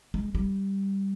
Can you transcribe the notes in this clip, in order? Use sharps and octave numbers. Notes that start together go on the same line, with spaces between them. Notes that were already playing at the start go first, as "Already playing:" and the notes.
G#3
G3